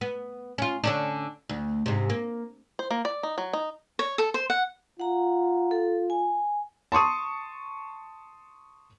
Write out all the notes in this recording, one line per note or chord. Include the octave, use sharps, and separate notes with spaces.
B3
C#4 F4
D3 C#4 D4
D2
G#2 C3
A#3
C5
A#3
D5
D#4
F#3
D#4
C#5
A4
C5
F#5
F4 F#5 A#5
A4
G#5
A5 C6 C#6 D#6